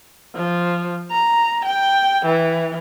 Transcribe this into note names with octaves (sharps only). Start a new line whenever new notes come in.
F3
A#5
G5
E3